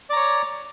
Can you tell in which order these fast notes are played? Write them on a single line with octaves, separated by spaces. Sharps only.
D5 A#5 C#5